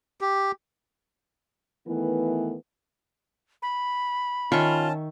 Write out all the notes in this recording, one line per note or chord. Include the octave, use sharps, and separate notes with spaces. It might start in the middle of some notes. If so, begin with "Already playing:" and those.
G4
D#3 E3 A3 B3 B4
B5
D#3 C#4 F4 E5 A5 C#6